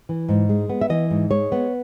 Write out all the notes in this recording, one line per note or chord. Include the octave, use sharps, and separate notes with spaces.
E3
G#2
G#3
B3
E5
E3 D#5
G#2
G#3 C#5
B3